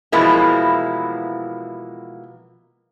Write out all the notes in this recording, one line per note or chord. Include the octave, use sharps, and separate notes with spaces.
B2 E3 F3 G#3 A#3 E4